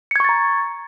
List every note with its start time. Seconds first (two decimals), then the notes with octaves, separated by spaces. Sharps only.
0.11 C#7
0.16 G#6
0.20 C#6
0.24 A6
0.29 A#5